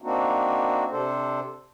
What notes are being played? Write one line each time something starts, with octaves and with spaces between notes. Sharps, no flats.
A#3 C4 D4 D#4 F#4
C3 D4 A4 C5